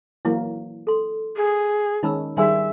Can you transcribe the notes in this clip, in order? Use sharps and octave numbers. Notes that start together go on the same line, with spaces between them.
E3 F#3 A#3 E4
A4 C6
G#4
D#3 G#3 C#4 D#4 B5 E6
D#3 G3 G#4 E5 G#5 C6